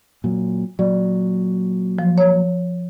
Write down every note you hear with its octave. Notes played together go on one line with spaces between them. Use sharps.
A#2 F#3
A#2 F#3 D5
F3
C#5